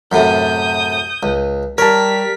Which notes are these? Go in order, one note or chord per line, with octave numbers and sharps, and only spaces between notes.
F#2 A2 C3 D#6 G6
C#2
G3 A#4 C#5 A5 B6